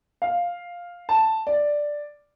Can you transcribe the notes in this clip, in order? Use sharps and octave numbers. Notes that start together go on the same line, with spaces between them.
F5
A5
D5